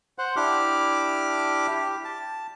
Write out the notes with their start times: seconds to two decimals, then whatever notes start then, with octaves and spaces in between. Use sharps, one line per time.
0.18 C5 F#5
0.36 D4 E4 G4 D6 F6
1.71 G4
2.05 A5